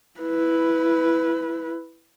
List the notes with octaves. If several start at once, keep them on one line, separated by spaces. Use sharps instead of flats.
E4 B4